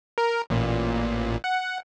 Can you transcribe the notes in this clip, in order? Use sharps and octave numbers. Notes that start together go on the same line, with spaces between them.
A#4
A1 A#2
F#5